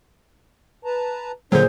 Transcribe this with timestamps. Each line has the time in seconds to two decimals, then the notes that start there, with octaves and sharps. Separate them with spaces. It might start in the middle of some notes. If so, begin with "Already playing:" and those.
0.85 B4 A5 A#5
1.52 A#2 D3 F#3 D4 G#4 C5 G6